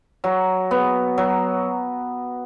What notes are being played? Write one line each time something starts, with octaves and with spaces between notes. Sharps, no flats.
F#3
B3
F#3